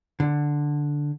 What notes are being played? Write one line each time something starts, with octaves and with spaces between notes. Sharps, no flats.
D3